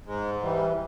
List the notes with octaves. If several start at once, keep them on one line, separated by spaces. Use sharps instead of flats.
G#2 G#3
E3 G3